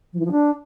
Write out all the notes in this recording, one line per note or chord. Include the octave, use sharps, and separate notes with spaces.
F3
E3
F3
D4